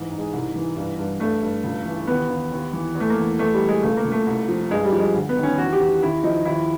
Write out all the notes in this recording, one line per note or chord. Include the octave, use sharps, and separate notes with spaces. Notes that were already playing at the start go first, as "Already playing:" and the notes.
Already playing: G#2 E3
G#2
G#3
C2
E3
G2
G2
G2 A3
G2
C#2
E3
D#2 B3
D#2
D#2
E3
E2
A3
A#3
E2
E2 A3
G3
E2
G#3
C#2 A3
A#3
C#2
A3
C2
F3
G2 G#3
G3
F3
G#3
D2
B3
D#3
C#4
E2 F#4
G4
E2
D#2 E4
F3 D#4
D#2 E4